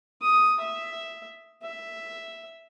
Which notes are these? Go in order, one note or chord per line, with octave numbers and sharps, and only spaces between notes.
D#6
E5
E5